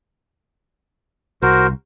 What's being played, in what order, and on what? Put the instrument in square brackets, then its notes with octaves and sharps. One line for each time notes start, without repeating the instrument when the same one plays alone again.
[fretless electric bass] C2 [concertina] F#4 A#4 C5